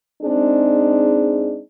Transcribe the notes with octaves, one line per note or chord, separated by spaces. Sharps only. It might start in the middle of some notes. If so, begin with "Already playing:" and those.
G#3 C4 D4 D#4 G#4